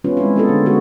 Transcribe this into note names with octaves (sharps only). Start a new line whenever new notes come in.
D#3 G3 B3 C#4 F4 B4
G#3 C4 E4
A#3 B3 F4 G#4 A4
D3
D3 G#3 B3 F#4 A4